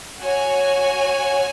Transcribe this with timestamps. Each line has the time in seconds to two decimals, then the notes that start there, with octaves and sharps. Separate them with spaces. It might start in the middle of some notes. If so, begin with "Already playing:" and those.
0.18 F#4 C#5 G#5